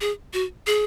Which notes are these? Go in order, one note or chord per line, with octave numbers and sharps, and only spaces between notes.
G#4
F#4
G#4